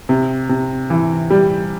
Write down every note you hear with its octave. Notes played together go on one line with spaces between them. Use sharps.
C3
C3
E3
G3